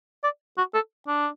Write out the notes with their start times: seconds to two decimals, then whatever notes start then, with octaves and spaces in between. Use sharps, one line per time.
0.24 D5
0.58 F#4
0.75 A4
1.08 D4